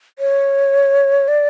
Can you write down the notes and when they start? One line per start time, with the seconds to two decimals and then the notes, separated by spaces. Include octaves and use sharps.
0.19 C#5
1.28 D5